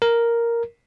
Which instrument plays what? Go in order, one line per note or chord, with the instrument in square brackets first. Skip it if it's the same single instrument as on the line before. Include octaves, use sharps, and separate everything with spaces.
[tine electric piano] A#4